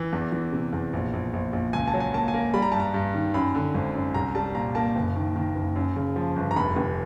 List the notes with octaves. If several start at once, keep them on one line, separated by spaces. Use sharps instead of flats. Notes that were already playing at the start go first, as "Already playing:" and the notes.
Already playing: E3
E2
E3
C3
E2
A#1
A#1
A#1
A#1
C#2 G#5
A5
F#3
G#5
A#3 A5
G#5
A#3
G3 B5
A#5
G2 A5
A#5
G2
D#3
F#2 B5
D3
G#1
F#2
C2 A#5
G3 A5
A#2 A#5
A#3 A5
F#1
D#3
D#3
F#1
F#2
C#3
F3
G1
A#5
F1 B5
F1